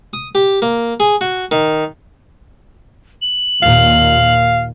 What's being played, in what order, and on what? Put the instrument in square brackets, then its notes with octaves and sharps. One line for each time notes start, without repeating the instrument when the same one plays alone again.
[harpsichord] D#6
G4
A#3
G#4
F#4
D#3
[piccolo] F#7
[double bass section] D#2 A#2 [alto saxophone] F5